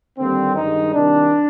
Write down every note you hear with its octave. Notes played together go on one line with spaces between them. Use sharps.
D#2 D3 G3 A#3 C4
G2 D#3 G#3 D#4
C2 C3 D#3 D4